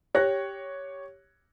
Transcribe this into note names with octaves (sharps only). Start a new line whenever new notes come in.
G4 C#5 F#6 A#6